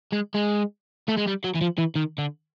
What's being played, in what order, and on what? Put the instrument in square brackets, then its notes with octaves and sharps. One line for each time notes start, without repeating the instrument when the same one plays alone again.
[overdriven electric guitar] G#3
G#3
A3
G#3
G3
F#3
E3
F3
E3
D#3
D3